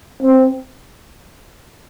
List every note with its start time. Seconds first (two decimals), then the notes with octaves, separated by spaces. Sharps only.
0.23 C4